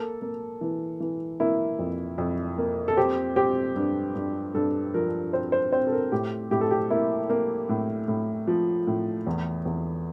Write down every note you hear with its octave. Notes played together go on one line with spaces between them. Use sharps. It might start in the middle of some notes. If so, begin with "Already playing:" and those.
Already playing: A#3 A4
A#3
E3
E3
A#3 E4
F2
F2
A#3
A4
C4 G4
C4 G4
G2
G2
G2 A4
F3 A#4
C4 C5
C5
C4 C5
A4
A#4
A2 G4
A2 G4
A4
G4
A#3 E4
A#3
A2
A2
F3
A2
E2
E2